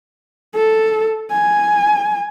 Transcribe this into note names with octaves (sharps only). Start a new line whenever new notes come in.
A4
G#5